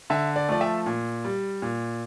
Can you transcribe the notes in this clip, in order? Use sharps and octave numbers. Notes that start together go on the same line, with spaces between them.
D3 E5
D5
F3 A3 D5
E5
A#2
G3
A#2